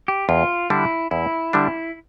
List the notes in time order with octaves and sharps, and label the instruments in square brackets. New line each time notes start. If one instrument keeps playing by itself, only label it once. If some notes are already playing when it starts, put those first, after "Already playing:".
[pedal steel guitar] G4
[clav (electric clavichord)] E2 [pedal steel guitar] F4
[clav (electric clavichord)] D3 G3 D4 [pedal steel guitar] E4
[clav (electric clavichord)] E2 [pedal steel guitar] E4
[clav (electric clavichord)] D3 G3 D4